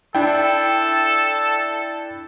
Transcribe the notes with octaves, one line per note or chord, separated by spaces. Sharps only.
D4 E4 A4 G5